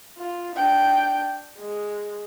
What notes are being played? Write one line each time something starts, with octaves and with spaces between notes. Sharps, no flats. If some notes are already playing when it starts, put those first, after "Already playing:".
F4
D4 G5
G#3